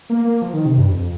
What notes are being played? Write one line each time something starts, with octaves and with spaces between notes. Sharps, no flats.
A#3
A#3
F3
D#3
C3
G2
F2